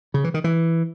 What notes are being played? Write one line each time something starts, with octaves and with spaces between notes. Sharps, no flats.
C#3
E3
D#3
E3